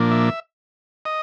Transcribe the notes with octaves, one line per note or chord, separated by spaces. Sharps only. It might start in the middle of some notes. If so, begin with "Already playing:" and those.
Already playing: A#2 F3 A#3 D4
E5
D#5